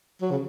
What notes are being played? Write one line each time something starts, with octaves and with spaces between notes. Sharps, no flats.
F#3
C#3